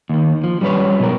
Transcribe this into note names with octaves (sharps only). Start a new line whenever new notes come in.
D#2 D#3
F3
G3 C#4 F#4 B4 C#5
B2 F#3 A#4